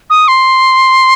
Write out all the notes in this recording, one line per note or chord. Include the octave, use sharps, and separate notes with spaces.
D#6
C6